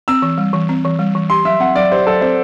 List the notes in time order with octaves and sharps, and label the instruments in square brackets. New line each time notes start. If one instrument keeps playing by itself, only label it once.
[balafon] C4 [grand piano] E6
[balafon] E3
G3
E3
C4
E3
G3
E3
[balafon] G4 [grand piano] C6
[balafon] F#3 [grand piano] E5
[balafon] C4 [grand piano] F#5
[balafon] F#3 [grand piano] D5
[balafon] G4 [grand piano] C5
[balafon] F#3 [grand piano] A4
[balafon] C4 [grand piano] C5